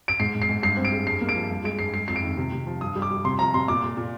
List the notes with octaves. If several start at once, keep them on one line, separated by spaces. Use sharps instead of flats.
D7
G#2 C7
G#2
C7
G#2
G2 C7
C4
D7
G#3
G2 C7
A#3
D7
F3
G2
G#3 D7
G2 C7
G#3 C7
F2 C7
D7
D#3
C3
C3
F3
G2 D#6
G3
D6
G3
C3 C6
F3 A#5
C3 C6
A#2 D6
A#2
A#2